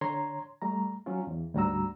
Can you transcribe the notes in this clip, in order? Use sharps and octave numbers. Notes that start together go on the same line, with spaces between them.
D3 C#5 A#5 C6 G#6
G3 A3 A#5
F#3 C#4 F4
E2
D2 G#2 G3 F#4 A#5 E6